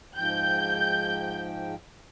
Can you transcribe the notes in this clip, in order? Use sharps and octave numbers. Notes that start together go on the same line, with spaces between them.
G#2 F3 G5 G6